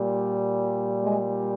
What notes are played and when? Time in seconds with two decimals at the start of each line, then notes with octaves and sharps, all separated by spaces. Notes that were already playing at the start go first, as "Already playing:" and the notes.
Already playing: A#2 G3
1.02 G#3